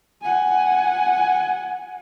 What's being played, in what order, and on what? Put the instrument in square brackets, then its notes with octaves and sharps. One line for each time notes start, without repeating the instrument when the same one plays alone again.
[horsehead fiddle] F#5 G#5